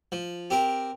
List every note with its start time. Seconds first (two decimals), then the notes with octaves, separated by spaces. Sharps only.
0.12 F3
0.50 C4 G4 A#4